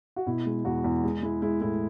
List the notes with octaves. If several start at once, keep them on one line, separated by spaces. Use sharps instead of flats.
F#4
B2 E4
G#3
E2 F#4
E2
G#3 G#4
G#3 E4
G#3 E4
A2 E4